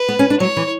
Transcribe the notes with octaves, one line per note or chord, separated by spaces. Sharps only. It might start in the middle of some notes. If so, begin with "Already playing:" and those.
Already playing: B4
B3
C#4
D4
F#3 C#5
E3